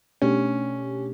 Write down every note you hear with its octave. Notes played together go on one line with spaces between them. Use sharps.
B2 A3 C#4 D4 G4